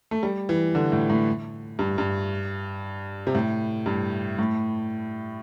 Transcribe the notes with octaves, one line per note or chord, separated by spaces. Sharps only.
A3
G3
E3
D3
A2
A2
G2
G2
C3
A2
G2
A2